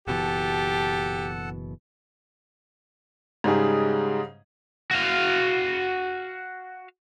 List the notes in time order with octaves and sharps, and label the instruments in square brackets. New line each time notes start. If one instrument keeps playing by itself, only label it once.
[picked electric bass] F#1 B2 E3 [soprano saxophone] G4 [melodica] A4 F#5 A5
[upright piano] G#2 C#3 G3 D#4 G#4
[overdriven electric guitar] F#4 F5